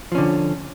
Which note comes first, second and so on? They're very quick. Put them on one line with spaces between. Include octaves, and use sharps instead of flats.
F3 C#4 D3